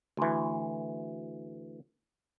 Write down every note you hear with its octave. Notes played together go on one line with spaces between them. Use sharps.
D2 E3